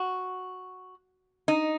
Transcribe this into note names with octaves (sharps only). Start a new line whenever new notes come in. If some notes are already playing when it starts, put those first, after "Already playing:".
Already playing: F#4
D#4